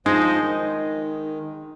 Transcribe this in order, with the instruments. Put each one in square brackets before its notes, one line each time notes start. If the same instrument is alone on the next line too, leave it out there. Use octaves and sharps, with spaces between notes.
[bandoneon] F3 C5 D#5 [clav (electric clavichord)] G#3 [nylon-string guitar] D#4
[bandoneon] D#3